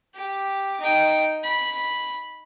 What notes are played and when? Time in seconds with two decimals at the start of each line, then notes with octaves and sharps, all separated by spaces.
0.15 G4
0.81 D#4 G5
1.44 B5